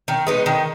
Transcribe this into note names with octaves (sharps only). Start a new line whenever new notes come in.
D#3
G#3 B3 D#4
D#3